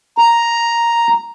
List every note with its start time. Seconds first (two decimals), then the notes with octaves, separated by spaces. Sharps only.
0.18 A#5